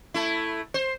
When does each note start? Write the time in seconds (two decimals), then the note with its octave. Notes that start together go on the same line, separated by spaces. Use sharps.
0.14 A3 E4
0.74 C5